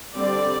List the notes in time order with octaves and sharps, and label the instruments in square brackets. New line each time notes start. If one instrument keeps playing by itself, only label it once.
[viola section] D3 G3 C4 D5